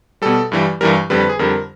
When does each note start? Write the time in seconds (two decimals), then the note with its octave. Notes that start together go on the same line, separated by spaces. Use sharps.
0.22 B2 G3 A4
0.52 G2 E3 G3
0.81 G2 E3 G3 A#4
1.10 F2 D3 G3 B4
1.20 B4
1.29 G#4
1.39 F2 D3 G3 A#4